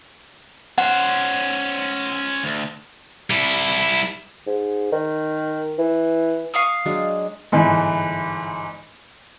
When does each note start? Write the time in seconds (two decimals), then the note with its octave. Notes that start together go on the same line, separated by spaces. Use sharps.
0.78 C#4 C5 F#5
2.44 D2
3.30 G3 E4
4.47 G#2
4.92 D#3
5.79 E3
6.54 F5 C#6 D#6
6.86 F#3 G#3 D4
7.52 G1 G#2 E3